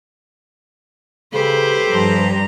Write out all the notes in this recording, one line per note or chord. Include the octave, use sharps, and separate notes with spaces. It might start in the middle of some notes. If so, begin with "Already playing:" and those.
C#3 G4 A4 B4 C5
G2 F3 A#5